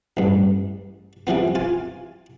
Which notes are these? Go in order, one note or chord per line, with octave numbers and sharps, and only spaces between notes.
A1 G2
C3 E3 F3 B3
F4 G#5